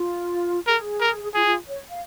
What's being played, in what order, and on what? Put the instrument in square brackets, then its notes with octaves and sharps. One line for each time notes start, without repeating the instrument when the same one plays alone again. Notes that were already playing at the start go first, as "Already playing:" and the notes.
Already playing: [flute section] F4
[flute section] G#4 [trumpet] A#4
[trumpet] A#4
[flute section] F4 [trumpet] G#4
[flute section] F4
C#5
F5